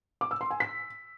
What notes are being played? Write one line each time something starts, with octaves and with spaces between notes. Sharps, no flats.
D6
E6
C6
G#5
B6